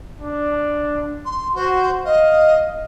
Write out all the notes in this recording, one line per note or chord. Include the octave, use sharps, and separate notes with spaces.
D4
C6
F#4 C5
D#5 F5